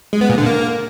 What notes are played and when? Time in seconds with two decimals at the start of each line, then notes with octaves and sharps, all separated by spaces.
0.13 G#3
0.21 B3
0.30 A#2
0.38 D3
0.46 A#3